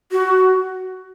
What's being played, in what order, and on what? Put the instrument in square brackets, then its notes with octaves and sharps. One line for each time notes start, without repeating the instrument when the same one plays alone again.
[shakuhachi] F#4